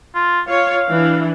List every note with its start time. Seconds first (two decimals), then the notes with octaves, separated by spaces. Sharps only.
0.15 F4
0.48 F4 C#5 F5
0.89 E3 D4